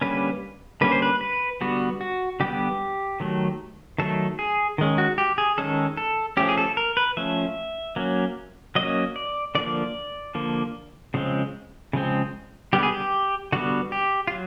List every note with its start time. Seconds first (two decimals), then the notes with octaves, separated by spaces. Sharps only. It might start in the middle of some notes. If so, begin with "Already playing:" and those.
0.01 D3 G3 A#3 C#4 B4
0.81 D3 G3 A#3 C#4 B4
0.92 C5
1.02 B4
1.21 B4
1.61 D3 G3 B3 F#4
2.01 F#4
2.40 D3 G3 B3 G4
3.20 D#3 F#3 A3
3.98 D#3 F#3 A3 A4
4.39 G#4
4.78 D#3 G#3 C#4
4.98 F#4
5.18 G4
5.38 G#4
5.58 D#3 G#3 C#4 A4
5.97 A4
6.37 F3 A3 C#4 G4
6.49 G#4
6.58 A4
6.77 A#4
6.97 B4
7.17 F3 A3 C#4 E5
7.96 F#3 A#3 C#4
8.75 F#3 A#3 C#4 D#5
9.16 D5
9.55 D3 F3 A#3 D5
10.35 D3 F3 A#3
11.14 C#3 F3 G#3 C4
11.93 C#3 F3 G#3 C4
12.73 D3 G3 B3 G4
12.83 G#4
12.92 G4
13.52 D3 G3 B3 F#4
13.92 G4
14.27 F4
14.32 F#3